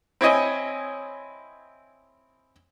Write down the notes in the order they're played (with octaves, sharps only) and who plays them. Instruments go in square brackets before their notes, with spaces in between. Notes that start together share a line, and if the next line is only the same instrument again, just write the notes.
[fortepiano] C4 E4 C#5 D#5 G#5